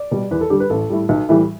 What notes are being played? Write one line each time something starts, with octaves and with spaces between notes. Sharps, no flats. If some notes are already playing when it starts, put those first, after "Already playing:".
Already playing: D5
B2 G3
E2 B4
A4
D3 G3 G4
B4
A1 A4
A2 G3
B1
A2 E3 G3